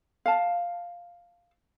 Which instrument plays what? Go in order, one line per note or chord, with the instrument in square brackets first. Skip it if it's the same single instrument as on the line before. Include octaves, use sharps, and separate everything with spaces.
[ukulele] F5 A5